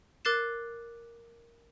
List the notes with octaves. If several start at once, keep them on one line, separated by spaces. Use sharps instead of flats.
A#4 D6 F#6 A6 C7 E7